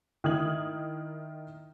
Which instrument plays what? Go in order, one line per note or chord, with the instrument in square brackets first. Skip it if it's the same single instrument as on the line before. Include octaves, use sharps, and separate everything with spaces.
[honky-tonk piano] D#3 E4 D#6 G#6 F#7